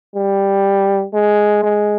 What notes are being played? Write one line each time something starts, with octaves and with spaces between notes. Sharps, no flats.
G3
G#3
G#3